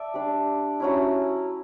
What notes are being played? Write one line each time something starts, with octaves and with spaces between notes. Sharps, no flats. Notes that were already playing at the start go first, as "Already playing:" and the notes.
Already playing: D5 E5 A5
G3 D4
F#3 C#4 E4